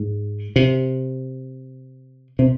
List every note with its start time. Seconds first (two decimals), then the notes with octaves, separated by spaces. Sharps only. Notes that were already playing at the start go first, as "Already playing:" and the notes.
Already playing: G#2
0.56 C3
2.39 C3